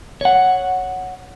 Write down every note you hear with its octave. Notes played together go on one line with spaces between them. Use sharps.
C#5 F#5